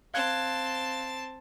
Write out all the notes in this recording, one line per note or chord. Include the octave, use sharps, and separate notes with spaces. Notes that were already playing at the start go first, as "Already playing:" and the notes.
C4 F5 A5 F#6 G#6